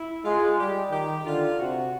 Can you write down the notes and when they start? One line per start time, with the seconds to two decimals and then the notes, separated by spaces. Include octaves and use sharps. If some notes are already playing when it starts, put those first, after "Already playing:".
Already playing: E4
0.25 G#3 F4
0.59 G3 G4
0.92 D#3 G4
1.26 D3 F4
1.59 C3 F#4